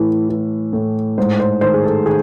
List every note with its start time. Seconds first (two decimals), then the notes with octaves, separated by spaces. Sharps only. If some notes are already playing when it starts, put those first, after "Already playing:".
Already playing: A2 E3
0.29 E3
0.73 A2
1.18 G#2 C5
1.40 C5
1.61 D#3 C5
1.74 G#4
1.84 A4
2.06 D#3 G#4